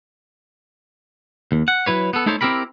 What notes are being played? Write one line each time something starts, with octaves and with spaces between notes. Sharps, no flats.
D#2
F#5
F#3 E4 B4 C#5
B3 A4
A3 D#4 E4 A4 C5 C#5
C4 E4 G4 A#4 B5